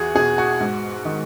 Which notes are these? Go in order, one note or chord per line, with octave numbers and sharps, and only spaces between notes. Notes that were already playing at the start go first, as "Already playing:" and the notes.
Already playing: E2 F#4 G#4
B2 G#4
F#4
G#2
D#3